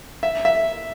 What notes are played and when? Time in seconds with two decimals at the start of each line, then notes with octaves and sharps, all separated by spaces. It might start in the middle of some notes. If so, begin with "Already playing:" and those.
0.23 E5
0.45 E5